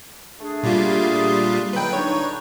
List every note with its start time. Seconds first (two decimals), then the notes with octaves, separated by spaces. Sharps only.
0.40 A3 D4 G#4
0.63 A#2 G3 F4
1.73 C#2 D3 F#3 B4 G5
1.93 D3 D4 D#4 C#5